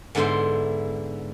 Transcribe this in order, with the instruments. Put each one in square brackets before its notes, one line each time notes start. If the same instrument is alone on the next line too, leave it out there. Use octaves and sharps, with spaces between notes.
[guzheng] G#2 D3 B3 E4 C5 C6